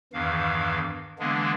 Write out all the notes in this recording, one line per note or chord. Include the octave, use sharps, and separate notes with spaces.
E2 G2 D#3 E3 F5
D3 E3 G#3 A#3 B3 D4